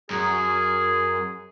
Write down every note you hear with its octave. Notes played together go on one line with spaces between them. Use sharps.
F#2 G#4